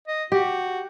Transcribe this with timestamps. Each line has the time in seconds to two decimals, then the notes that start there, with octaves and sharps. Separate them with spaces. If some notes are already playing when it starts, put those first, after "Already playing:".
0.08 D#5
0.32 F#4 G4